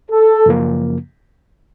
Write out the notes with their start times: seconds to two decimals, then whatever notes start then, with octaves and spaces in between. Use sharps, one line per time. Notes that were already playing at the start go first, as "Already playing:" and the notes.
0.10 A4
0.46 F#2 C#3 F3 A#3